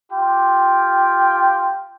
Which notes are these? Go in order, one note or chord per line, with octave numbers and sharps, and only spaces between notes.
F4 G4 G5